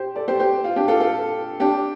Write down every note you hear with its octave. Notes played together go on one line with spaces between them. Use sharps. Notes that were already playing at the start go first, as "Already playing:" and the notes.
Already playing: G4 C5
A4 D5
G4 C5
G4 C5
F4
D4 G4
F4 A4
F4 A4
D4 G4